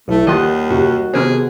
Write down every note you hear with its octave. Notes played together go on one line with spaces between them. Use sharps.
B1 A3 E4
D#2 D#3 G3 F4 C5 D#5 F#5
F#2 C3 F#4
C3 D#3 B3 C4 G#4 A#4 C5